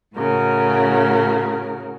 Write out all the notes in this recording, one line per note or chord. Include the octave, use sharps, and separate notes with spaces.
A2 C#3 F#4 A#4